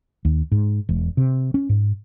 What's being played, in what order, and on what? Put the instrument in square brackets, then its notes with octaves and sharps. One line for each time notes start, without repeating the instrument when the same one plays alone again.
[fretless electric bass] D#2
G#2
E1
C3
C#4
G#2